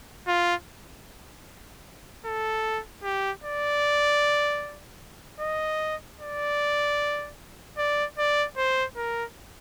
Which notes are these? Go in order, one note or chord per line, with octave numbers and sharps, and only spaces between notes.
F4
A4
G4
D5
D#5
D5
D5
D5
C5
A#4